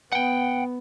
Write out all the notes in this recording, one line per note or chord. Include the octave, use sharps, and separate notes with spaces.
B3 F#5 G5